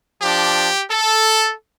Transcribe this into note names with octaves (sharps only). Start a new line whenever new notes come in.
F3 D4 G4
A4